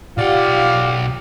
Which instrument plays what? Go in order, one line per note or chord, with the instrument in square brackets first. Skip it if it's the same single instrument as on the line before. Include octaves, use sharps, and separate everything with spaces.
[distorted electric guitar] B1 F#5 [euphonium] F4 [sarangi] G4 [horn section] D5 F5